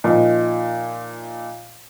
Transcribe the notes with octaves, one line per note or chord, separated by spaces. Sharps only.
A#2 F3 D#4